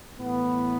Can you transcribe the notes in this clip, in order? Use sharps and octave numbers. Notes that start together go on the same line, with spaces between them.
A2 E3 B3